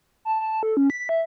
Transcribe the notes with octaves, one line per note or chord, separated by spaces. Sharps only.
A5
A5
A4
C#4
B6
E5